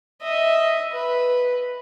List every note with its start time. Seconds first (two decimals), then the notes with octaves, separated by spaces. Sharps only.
0.22 D#5 E5
0.92 B4